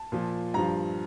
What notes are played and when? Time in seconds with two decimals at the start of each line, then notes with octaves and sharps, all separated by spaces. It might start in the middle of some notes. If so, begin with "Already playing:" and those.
Already playing: A5
0.12 A#2 F3
0.54 G2 F3 A#5